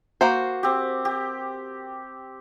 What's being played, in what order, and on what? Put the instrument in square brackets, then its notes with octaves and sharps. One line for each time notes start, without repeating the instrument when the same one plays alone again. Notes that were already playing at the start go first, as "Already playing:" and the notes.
[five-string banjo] A#3 F#4 C5
[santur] C4 G4
G4